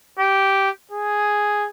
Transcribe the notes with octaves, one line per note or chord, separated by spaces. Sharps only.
G4
G#4